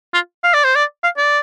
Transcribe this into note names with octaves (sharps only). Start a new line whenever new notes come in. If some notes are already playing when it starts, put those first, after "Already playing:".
F4
F5
D5
C5
D5
F5
D5